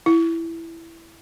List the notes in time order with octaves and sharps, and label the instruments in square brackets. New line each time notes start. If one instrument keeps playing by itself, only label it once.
[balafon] E4